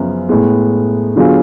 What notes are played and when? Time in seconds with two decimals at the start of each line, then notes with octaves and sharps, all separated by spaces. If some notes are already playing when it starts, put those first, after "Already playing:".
Already playing: F#2 C#3 F3 B3
0.29 A2 G#3 B3
1.16 D3 F#3 B3 F4 G#4